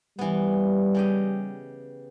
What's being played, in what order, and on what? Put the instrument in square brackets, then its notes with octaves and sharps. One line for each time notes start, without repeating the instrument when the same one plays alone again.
[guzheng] E3 B3 [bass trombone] G3
[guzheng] C#3 G4 D#5